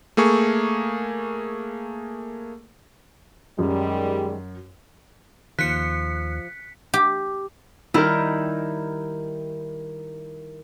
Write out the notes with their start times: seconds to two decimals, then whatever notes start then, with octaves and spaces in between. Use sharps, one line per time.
0.17 A3 A#3 G#4 C#6
3.59 F#2 D#3 G3 G#3
5.59 D#2 F3 F#6 B6 C#7
6.94 G4
7.94 D#3 G3 D#4 E4 A#4